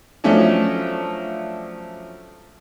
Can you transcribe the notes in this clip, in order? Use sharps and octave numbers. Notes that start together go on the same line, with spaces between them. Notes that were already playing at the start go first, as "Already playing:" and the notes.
F3 F#3 A3 C#4 D4